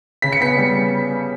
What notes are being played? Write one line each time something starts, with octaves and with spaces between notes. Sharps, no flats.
C#3 B6
C#7
B3 B6
G3